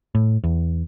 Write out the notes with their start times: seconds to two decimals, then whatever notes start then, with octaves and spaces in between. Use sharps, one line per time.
0.15 A2
0.44 E2